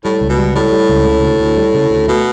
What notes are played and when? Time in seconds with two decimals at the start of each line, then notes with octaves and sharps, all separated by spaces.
0.04 A2 G3
0.21 C#2
0.29 B2
0.38 G3
0.55 A2 G3
0.72 G3
0.89 C#2
1.06 C#3
1.23 D2
1.40 D2
1.57 G3
1.74 C#3
1.91 D2
2.08 B2 A3